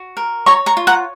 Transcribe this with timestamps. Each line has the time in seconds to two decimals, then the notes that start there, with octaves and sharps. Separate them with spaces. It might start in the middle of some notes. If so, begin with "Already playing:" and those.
Already playing: F#4
0.17 A#4
0.46 C#5 A#5 C#6
0.66 A#5 C#6
0.77 F4
0.87 F#5 A#5